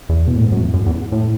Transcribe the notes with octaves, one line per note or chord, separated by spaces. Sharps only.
E2
B2
A2
G#2
F#2
E2
F#2
E2
A2